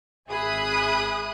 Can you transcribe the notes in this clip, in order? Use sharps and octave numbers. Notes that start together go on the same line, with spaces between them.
G#1 G#4 E5 B5 D#6 F#6